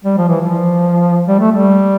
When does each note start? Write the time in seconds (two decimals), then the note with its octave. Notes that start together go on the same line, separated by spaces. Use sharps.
0.05 G3
0.17 F3
0.28 E3
0.41 F3
1.28 G3
1.40 A3
1.51 G3